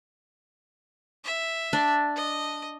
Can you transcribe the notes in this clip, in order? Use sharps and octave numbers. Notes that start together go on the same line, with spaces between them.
E5
D4
D#5